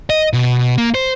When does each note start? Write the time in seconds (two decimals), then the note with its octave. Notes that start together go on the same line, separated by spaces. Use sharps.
0.10 D#5
0.33 B2
0.78 A#3
0.94 C5